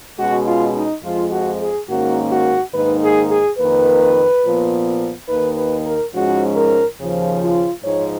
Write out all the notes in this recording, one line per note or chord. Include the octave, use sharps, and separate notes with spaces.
B2 G#3 C#4 F#4
F4
D#4
F2 F3 G#3 F4
F#4
G#4
G#2 D#3 A#3 C#4 F#4
F#4
G#2 D#3 A#3 D#4 B4
G#4
G#4
F2 D#3 A#3 B4
A#2 F3 B3
D#2 D#3 A#3 D#4 B4
B4
A#4
G#2 F3 G#3 C#4 F#4
A#4
D#2 C#3 F3
F4
G#2 F3 G#3 D#4 C#5